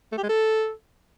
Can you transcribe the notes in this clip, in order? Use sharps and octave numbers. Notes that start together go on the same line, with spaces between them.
A3
G4
G#3
A4